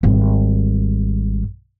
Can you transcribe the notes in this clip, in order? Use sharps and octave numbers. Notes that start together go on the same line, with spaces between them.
G#1 G3